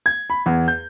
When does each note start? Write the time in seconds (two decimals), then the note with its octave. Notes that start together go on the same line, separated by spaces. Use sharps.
0.06 G#6
0.30 B5
0.46 E2
0.68 G6